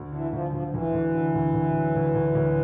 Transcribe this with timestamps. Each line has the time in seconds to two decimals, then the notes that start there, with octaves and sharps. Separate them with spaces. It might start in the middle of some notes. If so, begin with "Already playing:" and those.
Already playing: D2
0.12 D3 E3
0.33 D2 F3
0.53 D2 F3
0.67 F3
0.74 D2 E3
0.94 D2
1.14 D3
1.35 D2
1.54 D2
1.75 F#3
1.96 D2
2.15 D2
2.35 D2